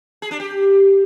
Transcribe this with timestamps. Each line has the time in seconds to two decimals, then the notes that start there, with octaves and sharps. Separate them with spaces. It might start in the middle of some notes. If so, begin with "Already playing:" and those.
0.22 G#4
0.31 D4
0.40 G4